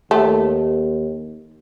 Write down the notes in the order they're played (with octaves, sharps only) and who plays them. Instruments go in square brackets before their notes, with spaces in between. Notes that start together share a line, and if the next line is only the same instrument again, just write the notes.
[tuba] D#2 [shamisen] A3